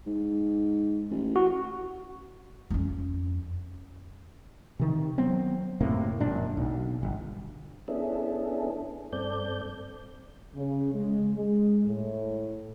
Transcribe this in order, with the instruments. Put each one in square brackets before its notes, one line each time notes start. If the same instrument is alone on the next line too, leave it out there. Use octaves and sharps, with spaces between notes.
[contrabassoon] G#2
A1
[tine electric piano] F#4
[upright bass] F2 C#4
[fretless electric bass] C3 D#3
F#3 B3 C4
F#1 A2 C3 A#3
G1 F#2 A#2 D4
B1
G1
[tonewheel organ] B3 C#4 D4 E4 G#4 A4
G2 C4 A4 D5 G6
[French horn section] C#3
G#3
G#3
A2